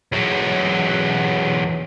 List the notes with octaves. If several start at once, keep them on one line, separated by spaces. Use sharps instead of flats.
E2 F#3